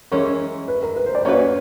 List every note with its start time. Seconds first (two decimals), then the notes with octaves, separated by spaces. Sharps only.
0.11 E3 G#3 C#4 A#4
0.68 B4
0.83 A#4
0.96 B4
1.06 C5
1.15 D5
1.25 A#3 C#4 F#4 B4 C#5
1.39 C#5